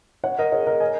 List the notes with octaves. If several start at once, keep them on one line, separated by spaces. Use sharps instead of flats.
C#5 F#5
A#4 D#5
G#4 C#5
A#4 D#5
D#5 G#5